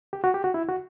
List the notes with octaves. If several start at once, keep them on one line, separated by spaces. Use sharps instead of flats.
G4
F#4
G4
F#4
E4
F#4